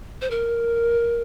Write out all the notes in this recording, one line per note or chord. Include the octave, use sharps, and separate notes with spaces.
C5
A#4